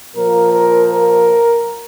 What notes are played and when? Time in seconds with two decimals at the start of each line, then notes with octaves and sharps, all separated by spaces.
0.16 A#2 F3 A#3 A#4
0.53 A#4
0.91 A#4